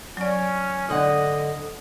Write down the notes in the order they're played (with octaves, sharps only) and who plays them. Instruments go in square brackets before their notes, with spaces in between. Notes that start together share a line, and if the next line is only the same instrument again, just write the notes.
[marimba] F#3 D5 [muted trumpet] C#4
[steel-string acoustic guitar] G#2 D3 F#5 [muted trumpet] D#5